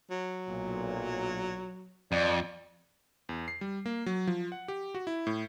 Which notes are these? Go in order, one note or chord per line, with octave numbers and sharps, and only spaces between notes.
F#3
B1 A#2
F2 D5
E2
C7
G3
A#3
F#3
F3
F#5
G4
F#4
E4
A2